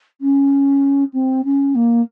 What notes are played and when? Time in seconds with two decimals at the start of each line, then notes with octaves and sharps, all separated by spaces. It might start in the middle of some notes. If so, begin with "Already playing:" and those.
0.21 C#4
1.13 C4
1.45 C#4
1.75 A#3